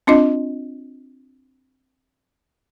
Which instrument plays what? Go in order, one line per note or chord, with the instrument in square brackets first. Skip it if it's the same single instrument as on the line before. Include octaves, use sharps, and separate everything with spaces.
[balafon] C4 D4 F4 D#5